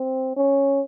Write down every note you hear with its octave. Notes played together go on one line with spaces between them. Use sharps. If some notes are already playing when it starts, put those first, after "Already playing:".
Already playing: C4
C#4